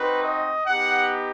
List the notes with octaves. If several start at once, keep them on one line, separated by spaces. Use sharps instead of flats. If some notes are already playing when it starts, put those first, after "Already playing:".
Already playing: C4 D#4 F#4 B4
D#5
B3 D#4 G4 F#5